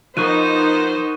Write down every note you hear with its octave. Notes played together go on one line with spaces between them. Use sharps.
F3 B3 D#4 A#4 C5 C#6 F#6 D#7